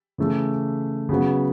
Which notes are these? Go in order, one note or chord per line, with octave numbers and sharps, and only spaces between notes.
C#3 E3 A3
C#3 F#3 B3